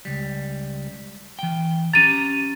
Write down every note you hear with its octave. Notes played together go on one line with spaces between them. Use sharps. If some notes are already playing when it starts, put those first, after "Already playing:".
C#2 G3
E3 G5
C#4 G4 A#5 A6 D#7